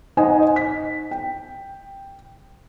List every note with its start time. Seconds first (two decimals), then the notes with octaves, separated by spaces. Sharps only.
0.17 D#4 C5 D#5 F#5 G#5
0.56 B6
1.11 G5